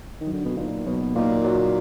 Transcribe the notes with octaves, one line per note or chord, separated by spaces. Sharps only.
D#3
F#3
D3
B2
A#2 A#3 D#4
B2 F#3
A#2 A#3 D#4
F#3